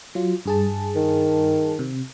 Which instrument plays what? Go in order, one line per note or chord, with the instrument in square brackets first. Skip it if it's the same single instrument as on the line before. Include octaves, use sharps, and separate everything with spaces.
[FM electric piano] F#3 F4
G2 G#4 A5
[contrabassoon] D#3
[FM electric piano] C3